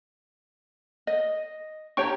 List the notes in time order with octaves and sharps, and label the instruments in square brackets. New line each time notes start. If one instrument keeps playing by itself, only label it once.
[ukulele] D#5
[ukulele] D4 G4 A#5 [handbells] C#5 G5 C#6